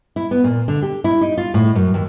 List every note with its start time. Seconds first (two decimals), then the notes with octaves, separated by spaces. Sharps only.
0.16 E4
0.31 B3
0.44 A#2
0.68 D3
0.82 G4
1.04 E4
1.21 D#4
1.37 F4
1.54 A2
1.75 F#2
1.94 D#2